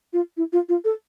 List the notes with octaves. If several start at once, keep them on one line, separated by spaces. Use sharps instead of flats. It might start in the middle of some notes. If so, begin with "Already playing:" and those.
F4
E4
F4
F4
A4